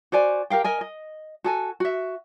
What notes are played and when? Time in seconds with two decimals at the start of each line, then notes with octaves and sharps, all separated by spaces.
0.12 F#4 C5 D5 G#5
0.50 G4 A#4 F5 G5
0.64 A#4 D#5 G#5
0.81 D#5
1.44 F#4 A4 G#5
1.80 F#4 E5